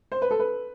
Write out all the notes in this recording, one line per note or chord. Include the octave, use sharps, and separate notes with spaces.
C5
B4
A4
B4